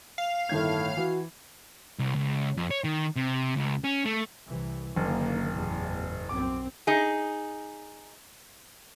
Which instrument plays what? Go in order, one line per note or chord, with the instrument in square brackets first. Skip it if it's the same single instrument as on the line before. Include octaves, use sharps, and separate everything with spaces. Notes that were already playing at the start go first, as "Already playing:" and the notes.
[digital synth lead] F5
[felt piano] G1 D#3 G#6 [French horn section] A2
[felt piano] E3 [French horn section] F#4
[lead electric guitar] C2
C#2
F2
C#5
D#3
C3
C#2
C#4
A3
[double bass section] C2 C3 E3
[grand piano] F#1 [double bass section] D3 D#3 A#3
[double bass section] A1 E2 B2
[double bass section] B1 F#2 C4 [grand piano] D6
[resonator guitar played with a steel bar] D#4 G#4